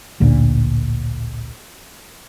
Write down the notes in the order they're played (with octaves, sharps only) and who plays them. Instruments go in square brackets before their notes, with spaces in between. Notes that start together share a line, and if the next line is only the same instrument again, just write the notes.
[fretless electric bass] A1 D2 A#2